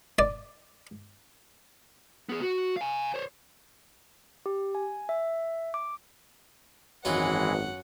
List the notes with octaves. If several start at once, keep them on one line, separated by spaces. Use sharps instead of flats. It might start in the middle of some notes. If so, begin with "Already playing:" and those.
D5
B3 G#4
F#4
F5 G#5
C5 C#5
G4
G#5
E5
D6
G#1 F#2 E3 G#3 F4 B4 F#5